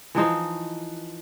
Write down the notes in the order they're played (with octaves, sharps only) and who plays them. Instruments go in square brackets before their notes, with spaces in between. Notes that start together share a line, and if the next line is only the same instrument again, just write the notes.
[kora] E3 F3 D#4 C5